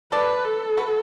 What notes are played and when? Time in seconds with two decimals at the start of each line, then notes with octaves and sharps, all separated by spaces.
0.12 A4 B4 D5
0.45 A4
0.77 F#4 B4